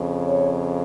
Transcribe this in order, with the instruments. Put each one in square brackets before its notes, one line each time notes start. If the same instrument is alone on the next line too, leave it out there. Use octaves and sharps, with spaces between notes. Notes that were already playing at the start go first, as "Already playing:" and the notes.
Already playing: [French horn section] F2 C#3
C#5